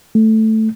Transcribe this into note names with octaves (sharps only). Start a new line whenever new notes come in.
A3